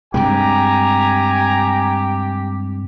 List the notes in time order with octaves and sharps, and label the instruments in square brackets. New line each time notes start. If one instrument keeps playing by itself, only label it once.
[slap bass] G2 C3 G#3 [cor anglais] G4 [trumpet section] G#5 A#5